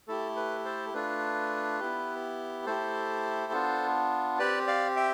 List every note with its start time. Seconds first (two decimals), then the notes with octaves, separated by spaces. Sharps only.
0.08 A3 E4 G4 A4
0.36 B4
0.65 A4 C5
0.94 A3 D4 F4 B4
1.80 B3 E4 G4
2.66 A3 E4 G4 A4 C5
3.52 B3 D4 F4
4.39 C4 G4 B4 D5
4.67 D5 F5
4.96 E5 G5